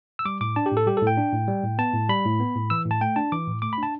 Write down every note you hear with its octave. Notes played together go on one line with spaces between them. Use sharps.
E6
G3 D6
A2 D6
D4 A5
G4
A2
A4
G3 G4
A4
A2 G5
D4
A2
G3
A2
B3 A5
A2
G3 B5
A2
B3
A2
E3 E6
A2
A5
A3 G5
D4 A5
E3 D6
A2
A3 D6
B5
D4 A5